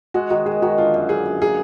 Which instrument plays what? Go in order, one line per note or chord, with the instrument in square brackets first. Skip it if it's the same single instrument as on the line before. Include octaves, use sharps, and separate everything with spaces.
[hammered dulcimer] G#3 [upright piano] F#4
[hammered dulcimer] D#3 [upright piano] F#4
[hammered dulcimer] D#3 [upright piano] G#4
[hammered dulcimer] D#3 [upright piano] F#4
[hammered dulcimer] D3 [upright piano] F4
[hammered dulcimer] F#2
[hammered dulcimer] F#2 [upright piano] G#4
[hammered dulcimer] F#2
[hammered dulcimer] A#3 [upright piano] G#4